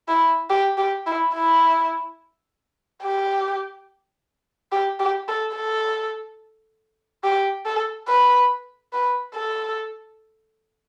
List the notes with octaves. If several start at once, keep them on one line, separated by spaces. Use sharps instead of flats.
E4
G4
G4
E4
E4
G4
G4
G4
A4
A4
G4
A4
B4
B4
A4